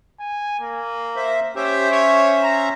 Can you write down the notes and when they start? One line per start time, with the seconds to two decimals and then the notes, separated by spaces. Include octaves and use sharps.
0.20 G#5
0.60 A#3
1.16 C5 E5
1.56 C#4 G4 C5 E5
1.92 C#5
2.43 A#5